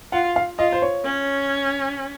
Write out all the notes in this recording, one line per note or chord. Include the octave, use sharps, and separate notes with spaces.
F4 F#5
F5
F4 D#5
C5
C#5
C#4